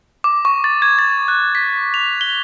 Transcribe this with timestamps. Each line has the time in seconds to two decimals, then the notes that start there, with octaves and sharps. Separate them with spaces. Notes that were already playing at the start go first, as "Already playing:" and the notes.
0.24 D6
0.45 C#6
0.64 A6
0.82 G#6
0.99 A6
1.28 F#6
1.55 B6
1.94 F7
2.21 G7